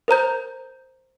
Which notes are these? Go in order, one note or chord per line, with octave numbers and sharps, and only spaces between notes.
A#4 C5 A#5 G6